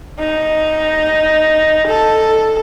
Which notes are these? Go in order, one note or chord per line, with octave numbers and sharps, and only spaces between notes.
D#4
A4